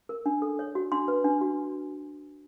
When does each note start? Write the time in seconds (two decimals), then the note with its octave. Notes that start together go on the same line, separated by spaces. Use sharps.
0.09 A#4
0.26 D4
0.42 A4
0.59 C#5
0.75 F#4
0.92 D4 C6
1.08 B4
1.24 D4
1.41 F#4